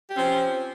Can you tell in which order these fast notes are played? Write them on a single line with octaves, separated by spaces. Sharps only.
G4 C#4 C4 F3